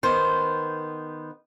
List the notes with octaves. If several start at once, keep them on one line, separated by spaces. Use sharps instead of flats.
D#3 B3 C5